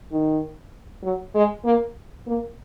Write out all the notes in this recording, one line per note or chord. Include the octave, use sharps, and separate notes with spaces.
D#3
F#3
G#3
A#3
A#3